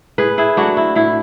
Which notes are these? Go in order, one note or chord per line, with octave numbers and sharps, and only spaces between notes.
A2 G#4 B4
E4 G#4
F#3 A3 D4 F#4
E4
A2 E4